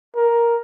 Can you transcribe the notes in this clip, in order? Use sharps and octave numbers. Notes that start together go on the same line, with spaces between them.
A#4